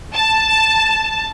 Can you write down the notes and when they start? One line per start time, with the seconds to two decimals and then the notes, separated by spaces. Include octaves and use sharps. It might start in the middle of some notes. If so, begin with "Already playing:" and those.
0.14 A5